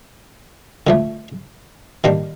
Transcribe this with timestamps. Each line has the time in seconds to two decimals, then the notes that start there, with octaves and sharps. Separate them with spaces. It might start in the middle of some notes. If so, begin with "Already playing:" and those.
0.87 D3 F3 A3
2.04 D#3 G3 A#3 D4